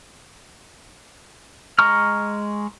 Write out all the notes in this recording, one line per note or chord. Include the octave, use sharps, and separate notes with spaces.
G#3 A#5 C#6 F6